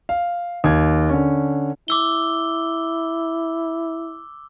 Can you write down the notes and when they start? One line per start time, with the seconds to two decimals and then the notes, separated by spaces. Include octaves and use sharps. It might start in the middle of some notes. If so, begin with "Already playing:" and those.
0.09 F5
0.64 D#2 G#6
1.09 D3 C#4
1.88 E4 D6 E6 G7